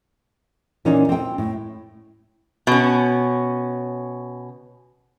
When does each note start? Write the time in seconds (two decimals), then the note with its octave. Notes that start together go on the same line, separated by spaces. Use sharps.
0.85 A#2 E3 C#4 D#4 F4
1.09 C4 G5
1.38 A2
2.67 B2 C#4